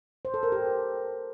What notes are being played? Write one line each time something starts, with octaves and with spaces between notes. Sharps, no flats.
C5
A4
A#4
G4